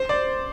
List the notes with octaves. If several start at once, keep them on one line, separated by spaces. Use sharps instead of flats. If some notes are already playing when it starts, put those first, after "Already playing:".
Already playing: C5
D5